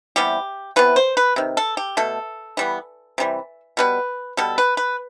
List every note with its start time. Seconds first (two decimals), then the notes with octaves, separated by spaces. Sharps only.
0.16 C3 E3 G3 B3 G4
0.76 C3 E3 B3 B4
0.96 C5
1.17 B4
1.36 C3 D#3
1.57 A4
1.77 G4
1.97 B2 A3 A4
2.57 E3 G3 B3
3.18 C3 E3 G3
3.77 B2 G3 B3 B4
4.37 B2 G3 B3 A4
4.58 B4
4.77 B4